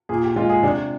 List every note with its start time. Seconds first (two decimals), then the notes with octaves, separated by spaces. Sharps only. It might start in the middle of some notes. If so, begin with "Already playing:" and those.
0.09 A#2 G#4
0.23 G4
0.36 G#3 F4
0.49 G#4
0.63 C3 D4